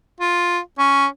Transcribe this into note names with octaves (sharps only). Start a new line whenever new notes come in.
F4
C#4